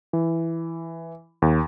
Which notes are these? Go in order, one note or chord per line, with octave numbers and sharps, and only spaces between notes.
E3
D#2